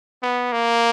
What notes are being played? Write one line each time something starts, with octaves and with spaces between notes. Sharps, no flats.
B3
A#3